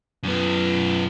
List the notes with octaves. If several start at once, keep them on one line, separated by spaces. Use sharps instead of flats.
F#2 B3